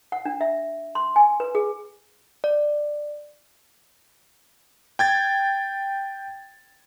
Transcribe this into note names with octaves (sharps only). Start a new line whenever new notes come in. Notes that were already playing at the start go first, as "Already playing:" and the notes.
F#5
D4
E5
C6
G#5
B4
G#4
D5
G5 G#6 A6